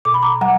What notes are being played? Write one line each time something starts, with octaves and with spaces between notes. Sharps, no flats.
B2 D6
B5
A#5 D6
F#3 F#5 A#5